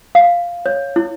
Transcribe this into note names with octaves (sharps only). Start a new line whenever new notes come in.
F5
C#5
E4